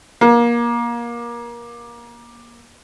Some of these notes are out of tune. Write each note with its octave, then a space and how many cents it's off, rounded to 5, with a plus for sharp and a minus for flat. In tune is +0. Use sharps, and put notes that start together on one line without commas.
A#3 +25